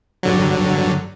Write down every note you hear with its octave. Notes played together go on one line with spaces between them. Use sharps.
G2 D3 F#3